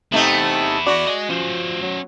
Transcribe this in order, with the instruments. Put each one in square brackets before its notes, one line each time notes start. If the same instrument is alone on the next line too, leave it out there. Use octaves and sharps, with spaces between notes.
[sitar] C3 A3 D#4 [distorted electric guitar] B3 E4
[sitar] F#4 [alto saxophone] D5
[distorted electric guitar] D#5 G#5
[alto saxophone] F3 [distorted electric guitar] C#4 C5
[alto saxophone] F#3